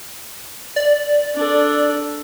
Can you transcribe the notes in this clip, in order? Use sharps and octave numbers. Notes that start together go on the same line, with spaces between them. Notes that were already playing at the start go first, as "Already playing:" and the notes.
D5
D4 A4